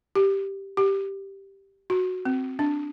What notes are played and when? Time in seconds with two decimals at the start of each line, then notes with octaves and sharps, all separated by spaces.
0.15 G4
0.77 G4
1.90 F#4
2.25 C4
2.59 D4